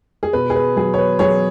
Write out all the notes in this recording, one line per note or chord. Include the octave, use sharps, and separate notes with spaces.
G#4
B2 B4
G#4
B4
F#3 G#4
C#5
B4
F#3 G#4 C#5